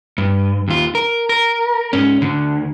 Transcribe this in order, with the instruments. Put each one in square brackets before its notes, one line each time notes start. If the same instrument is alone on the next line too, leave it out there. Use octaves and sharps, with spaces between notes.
[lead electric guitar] G2
D#2 F4
A#4
A#4
G#2 C#4
D2 D3